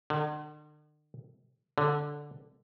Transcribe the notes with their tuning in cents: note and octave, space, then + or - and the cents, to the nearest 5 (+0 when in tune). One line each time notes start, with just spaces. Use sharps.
D3 +45
D3 +0